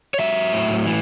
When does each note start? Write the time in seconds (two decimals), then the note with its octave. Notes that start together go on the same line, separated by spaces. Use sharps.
0.14 C#5
0.19 F#3 E5
0.53 A2
0.86 E3